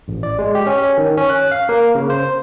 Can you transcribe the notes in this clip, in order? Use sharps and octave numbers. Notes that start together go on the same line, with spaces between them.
A1
D5
G#3
G4
C#4
D#3
C#4
F#6
F5
A#3
C#3
C5